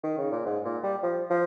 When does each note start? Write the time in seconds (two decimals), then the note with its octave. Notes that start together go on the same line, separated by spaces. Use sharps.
0.03 D#3
0.18 C#3
0.31 A#2
0.46 G#2
0.65 A#2
0.83 G3
1.03 F3
1.30 F3